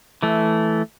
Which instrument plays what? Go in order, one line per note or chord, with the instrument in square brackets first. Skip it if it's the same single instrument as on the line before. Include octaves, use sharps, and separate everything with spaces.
[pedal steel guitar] E3 A3